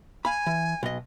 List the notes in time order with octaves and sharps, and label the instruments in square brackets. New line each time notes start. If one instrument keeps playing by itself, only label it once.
[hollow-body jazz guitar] F5 B5 [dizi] G#5
[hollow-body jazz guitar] E3
B1 D#5